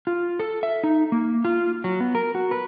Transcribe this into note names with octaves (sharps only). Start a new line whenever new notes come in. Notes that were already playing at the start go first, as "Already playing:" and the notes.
F4
A4
E5
D#4
A#3
F4
F#3
B3
A#4
F#4
B4